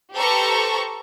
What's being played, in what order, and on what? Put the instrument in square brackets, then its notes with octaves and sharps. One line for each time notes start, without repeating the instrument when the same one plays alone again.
[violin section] G4 A4 B4 C5 A#5 C#6